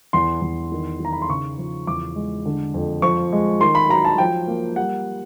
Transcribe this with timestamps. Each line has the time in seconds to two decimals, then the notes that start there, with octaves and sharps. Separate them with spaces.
0.13 E2 C6
0.42 E2
0.72 D#3
1.00 D#3 A#5
1.13 B5
1.22 C6
1.30 C#3 C#6
1.58 F3
1.87 E2 D6
2.15 G#3
2.45 D3
2.74 F2
3.02 F3 C#6
3.32 G#3
3.60 D#3 C6
3.75 B5
3.89 F#3 A#5
4.04 A5
4.18 F3 G5
4.48 A#3
4.76 G3 F#5